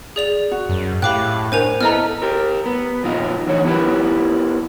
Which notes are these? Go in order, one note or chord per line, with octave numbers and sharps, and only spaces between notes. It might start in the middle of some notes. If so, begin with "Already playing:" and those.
G#4 D5 F7
F#4
F#2
A2 G4 F5 G5 B5 D6 F#6
D4 A#4 C5 C#5 G#5 F7
B3 E4 A4 D#5 A#5 F6
G4 A#4
B3
F2 A#2 D#4 F4
E2 D3 E3 C#5
B3 E4 G4 A#4 B4